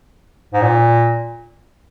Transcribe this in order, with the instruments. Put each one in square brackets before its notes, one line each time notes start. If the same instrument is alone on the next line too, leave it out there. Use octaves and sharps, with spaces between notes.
[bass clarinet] G#2
A#2